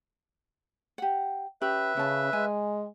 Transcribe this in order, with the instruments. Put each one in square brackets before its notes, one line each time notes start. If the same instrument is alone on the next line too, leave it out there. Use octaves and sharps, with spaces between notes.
[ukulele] G4 F#5
[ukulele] C#4 G4 B5 [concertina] B4 E5
[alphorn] C#3 [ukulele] C#4 A5
[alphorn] G#3 [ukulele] G#5